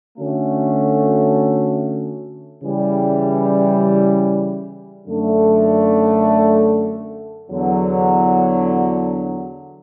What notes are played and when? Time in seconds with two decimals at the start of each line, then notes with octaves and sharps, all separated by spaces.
0.19 D3 A3 C#4 F#4
2.62 C#3 E3 G3
5.06 F#2 D3 A3 D4
7.50 E2 D3 F#3